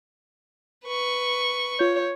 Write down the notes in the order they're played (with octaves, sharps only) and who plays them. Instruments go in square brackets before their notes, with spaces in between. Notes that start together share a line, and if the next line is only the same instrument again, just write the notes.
[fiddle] B4 C#6
[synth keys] F4 G6 [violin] C#5